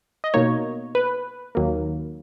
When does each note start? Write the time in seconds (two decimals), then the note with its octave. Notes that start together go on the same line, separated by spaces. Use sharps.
0.24 D#5
0.34 B2 A#3 D#4 C#5
0.95 B4
1.55 D#2 D#3 F#3 A#3